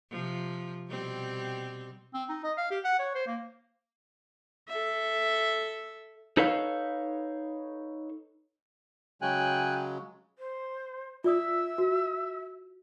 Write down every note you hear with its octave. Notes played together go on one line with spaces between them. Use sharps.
C3 F3
B2 G3 C4
C4
D#4
D#5
F5
G4
F#5
C#5
C5
A#3
A4 E5
D#4 A4 B4 C#5 F5
C#3 F#3 G#3 G5 G#5 F#6
C5
F4 D5 E5 D#6
F#4